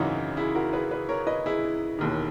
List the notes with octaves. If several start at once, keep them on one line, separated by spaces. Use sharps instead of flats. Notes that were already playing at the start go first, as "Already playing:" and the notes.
Already playing: G#1 F#2 C#3 E3 D#4 F#4
E4 G#4
F#4 A#4
G#4 B4
G#4 B4
A#4 C#5
B4 D#5
E4 G#4
E1 D#2 D#3